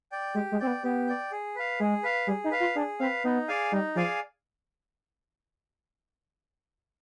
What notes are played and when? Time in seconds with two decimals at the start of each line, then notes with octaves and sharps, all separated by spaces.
0.12 D5 G5
0.34 G#3 G4
0.52 G#3
0.59 C4 D5 G5
0.67 B3
0.84 B3 G4
1.07 D5 G5
1.32 G#4
1.56 B4 F5
1.80 G#3 G#4
2.04 B4 F5
2.27 G3 G#4
2.44 D#4
2.51 B4 F5
2.60 F4
2.75 D4 G#4
2.99 C4 B4 F5
3.24 B3 D#4
3.48 G#4 D5 F5 G#5
3.72 G3 D#4
3.95 F3 G#4 D5 F5 G#5